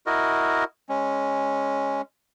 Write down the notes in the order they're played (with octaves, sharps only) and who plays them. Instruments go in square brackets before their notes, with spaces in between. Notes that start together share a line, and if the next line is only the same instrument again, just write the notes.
[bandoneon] E4 F#4 A#4 D#5
G#3 C#4